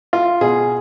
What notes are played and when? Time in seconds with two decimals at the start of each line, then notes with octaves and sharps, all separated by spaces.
0.13 F4
0.41 B2 G#4